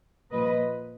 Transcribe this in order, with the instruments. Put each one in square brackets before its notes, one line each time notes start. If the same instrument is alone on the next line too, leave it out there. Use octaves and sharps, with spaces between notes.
[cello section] A#2 F3 A#3 B4 D#5